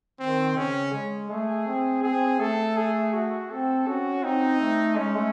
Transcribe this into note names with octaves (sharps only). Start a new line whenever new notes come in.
D#3 C4
C#3 C#4
G#3
A3 G#4
C4
C4 G#4
A3 A4
G#4
F#4
C4 A4
C#4 F#4
C4 D#4
A3
G#3 C#4
A3